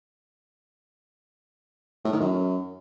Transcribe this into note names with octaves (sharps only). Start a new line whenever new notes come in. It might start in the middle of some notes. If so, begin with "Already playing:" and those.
A2
D#3
F#2